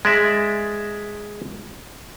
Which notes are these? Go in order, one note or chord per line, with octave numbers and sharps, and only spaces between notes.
G#3 D5 E5